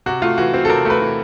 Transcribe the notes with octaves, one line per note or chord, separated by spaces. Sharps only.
C3 F#4
A3 F4
E3 F#4
C4
A4
C3 A#4
A3 B4
E3